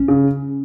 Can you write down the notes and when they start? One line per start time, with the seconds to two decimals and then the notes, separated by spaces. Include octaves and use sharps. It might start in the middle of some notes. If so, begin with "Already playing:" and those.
Already playing: C#4
0.08 C#3